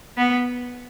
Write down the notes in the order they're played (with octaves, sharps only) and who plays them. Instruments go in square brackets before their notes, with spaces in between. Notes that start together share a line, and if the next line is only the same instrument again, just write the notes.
[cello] B3